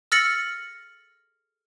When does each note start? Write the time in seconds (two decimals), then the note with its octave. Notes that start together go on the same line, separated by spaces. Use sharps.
0.12 E6 F6 A6 A#6 C#7 F#7